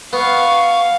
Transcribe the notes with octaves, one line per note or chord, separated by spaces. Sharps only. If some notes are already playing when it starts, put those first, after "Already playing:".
B3 F5 C#6